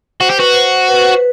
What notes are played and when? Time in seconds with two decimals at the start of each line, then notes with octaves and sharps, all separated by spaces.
0.20 F#4 C5
0.30 G4
0.38 F#4 B4
0.54 C5
0.88 B4
0.99 C5
1.11 B4